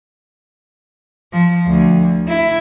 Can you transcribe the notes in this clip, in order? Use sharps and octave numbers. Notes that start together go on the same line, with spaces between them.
F3
D2
E4